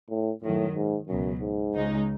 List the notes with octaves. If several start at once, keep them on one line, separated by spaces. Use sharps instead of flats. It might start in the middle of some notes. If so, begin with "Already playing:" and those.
A2
F#2 A2 D#3 F#3
G#2
C#2 F#2 B2 F#3
G#2
C#2 C#3 G#3 D#4